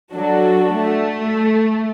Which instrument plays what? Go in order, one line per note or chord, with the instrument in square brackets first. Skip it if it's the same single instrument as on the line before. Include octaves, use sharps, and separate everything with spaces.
[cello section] F#3 [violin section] D4 F#4 A4
[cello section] A3